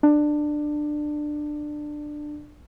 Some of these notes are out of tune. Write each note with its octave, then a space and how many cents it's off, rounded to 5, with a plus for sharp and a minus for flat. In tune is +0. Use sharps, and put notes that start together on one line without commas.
D4 +20